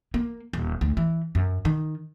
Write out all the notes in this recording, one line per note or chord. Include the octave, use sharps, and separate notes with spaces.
A#3
D#1
D2
E3
F#2
D#3